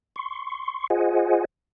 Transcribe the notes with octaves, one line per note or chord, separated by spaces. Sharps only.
C6 C#6
F4 G#4 C5 D#5 F#5 G#5